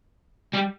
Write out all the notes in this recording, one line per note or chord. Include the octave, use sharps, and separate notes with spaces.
G3